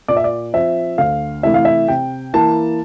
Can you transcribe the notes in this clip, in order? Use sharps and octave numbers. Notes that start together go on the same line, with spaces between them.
A#2 D5
E5
D5
F3 C4 E5
D2 F5
C3 E3 A3 E4 E5
F5
E5
C3 G5
E3 A#3 E4 A5